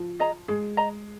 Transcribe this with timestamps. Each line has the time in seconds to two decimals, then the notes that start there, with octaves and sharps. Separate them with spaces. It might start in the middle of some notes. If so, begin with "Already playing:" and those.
Already playing: F3
0.19 G#4 D#5 A#5
0.48 G#3 G#4
0.77 D#5 A#5